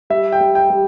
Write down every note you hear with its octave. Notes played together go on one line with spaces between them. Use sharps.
G3 E5
G5
G3
G5
G3